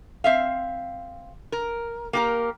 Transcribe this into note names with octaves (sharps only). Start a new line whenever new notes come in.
C4 E5 F5
A#4
A#3 G4 A#4